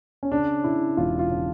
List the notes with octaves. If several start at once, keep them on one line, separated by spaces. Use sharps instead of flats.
C#4
C#3 D4
C#3 E4
E1 F4
F4
C#3